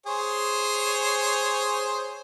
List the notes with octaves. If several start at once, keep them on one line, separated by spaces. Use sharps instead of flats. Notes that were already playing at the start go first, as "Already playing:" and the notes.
G#4 C5 C#5